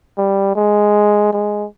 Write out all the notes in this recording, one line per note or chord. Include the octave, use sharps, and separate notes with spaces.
G3
G#3
G#3